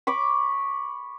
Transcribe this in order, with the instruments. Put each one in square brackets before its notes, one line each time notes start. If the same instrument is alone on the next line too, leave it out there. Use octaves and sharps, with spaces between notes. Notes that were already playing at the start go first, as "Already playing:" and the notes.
[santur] B5 C#6 D6